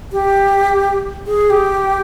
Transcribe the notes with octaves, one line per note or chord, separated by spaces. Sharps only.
G4
G#4
G4